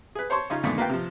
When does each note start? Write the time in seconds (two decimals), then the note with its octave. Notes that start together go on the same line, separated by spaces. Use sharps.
0.15 G#4 B4
0.30 C5 C#5 A5 C6 C#6
0.50 C#3 C#4 D#4 F4
0.63 F2 G#2 B2 D3 D#3 A3
0.78 A#3 F4 B4 F5 G5
0.89 C3 F3